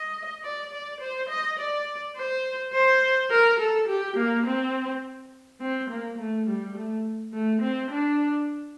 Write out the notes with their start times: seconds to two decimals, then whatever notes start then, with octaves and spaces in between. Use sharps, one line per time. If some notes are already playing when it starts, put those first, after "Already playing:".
Already playing: D#5
0.43 D5
0.72 D5
1.01 C5
1.29 D#5
1.58 D5
2.16 C5
2.73 C5
3.30 A#4
3.59 A4
3.88 G4
4.17 A#3
4.46 C4
5.60 C4
5.90 A#3
6.18 A3
6.47 G3
6.75 A3
7.33 A3
7.62 C4
7.90 D4